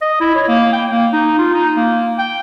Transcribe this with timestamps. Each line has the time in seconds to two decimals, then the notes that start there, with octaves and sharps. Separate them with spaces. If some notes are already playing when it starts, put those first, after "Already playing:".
0.02 D#5
0.21 E4
0.36 C#5
0.48 A#3
0.73 G5
0.91 A#3
1.13 D#4
1.39 F4
1.54 D#4
1.77 A#3
2.19 G5